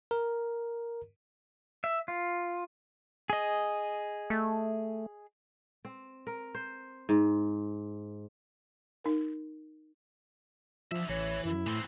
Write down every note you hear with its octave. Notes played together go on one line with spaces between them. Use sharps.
A#4
E5
F4
G#4 D#5
A3
C4
A#4
C5
G#2
D#4 A#4
D3 F3 E5
A1 E3 C#5
F#2 E4
A2 E3 C4